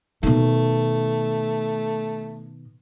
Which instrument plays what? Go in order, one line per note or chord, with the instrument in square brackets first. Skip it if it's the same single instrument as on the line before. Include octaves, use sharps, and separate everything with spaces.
[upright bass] B2 D#3 [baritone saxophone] A3